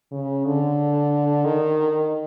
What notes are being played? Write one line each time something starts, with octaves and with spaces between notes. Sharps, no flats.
C#3
D3
D#3